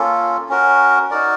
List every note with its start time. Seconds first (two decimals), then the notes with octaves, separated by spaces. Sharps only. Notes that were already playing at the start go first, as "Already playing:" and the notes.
Already playing: A#3 C#4 F4 A4
0.49 C#4 F#4 A#4
1.11 D#4 F#4 A#4 D5